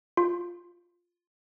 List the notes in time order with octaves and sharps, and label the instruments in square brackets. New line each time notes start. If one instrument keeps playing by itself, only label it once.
[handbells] F4